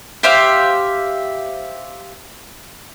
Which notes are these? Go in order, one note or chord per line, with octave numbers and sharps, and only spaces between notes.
G4 C5 E5 F5